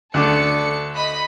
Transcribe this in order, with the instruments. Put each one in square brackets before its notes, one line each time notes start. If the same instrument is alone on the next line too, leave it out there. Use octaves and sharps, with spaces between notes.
[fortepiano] D2 D4 D6 [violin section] A4 C#7
[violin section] D#5 B5